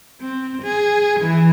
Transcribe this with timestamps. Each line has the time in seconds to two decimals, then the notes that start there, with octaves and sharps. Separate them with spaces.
0.21 C4
0.62 G#4
1.20 E3